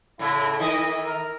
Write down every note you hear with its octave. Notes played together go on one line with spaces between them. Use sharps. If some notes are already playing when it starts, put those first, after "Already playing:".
A2 C#3 E4
D#3 E4 D#5
A#4